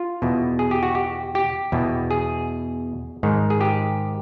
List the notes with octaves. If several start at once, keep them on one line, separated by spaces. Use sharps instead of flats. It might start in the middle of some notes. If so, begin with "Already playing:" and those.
Already playing: F4
E2 B2
G#4
G4
F#4
G4
G4
E2 B2
G#4
G#2 D#3
G#4
G4